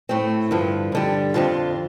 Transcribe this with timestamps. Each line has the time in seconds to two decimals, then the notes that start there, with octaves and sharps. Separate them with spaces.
0.09 A2 A3 C4
0.51 G2 D3 F3
0.92 G2 D3 G3
1.34 F2 D3 F3 C4 F4